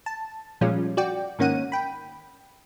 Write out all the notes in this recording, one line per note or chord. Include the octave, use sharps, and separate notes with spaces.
A5
A#2 F3 G3 G#3 C#4 F4
F#4 D5 G5
G#2 D#3 A#3 C#4 F#5 D#7
G5 B5